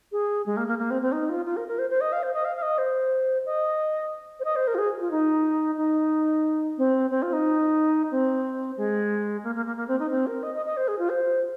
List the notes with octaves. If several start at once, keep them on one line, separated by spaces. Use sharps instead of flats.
G#4
G#3
A#3
A#3
A#3
C4
C4
D#4
F4
F4
A#4
A#4
C5
C5
D#5
F5
C5
D#5
F5
F5
D#5
C5
D#5
C5
D#5
C5
A#4
F4
G#4
F4
D#4
D#4
C4
C4
F4
D#4
C4
G#3
A#3
A#3
A#3
A#3
C4
D#4
C4
A#4
D#5
D#5
D#5
C5
G#4
F4
C5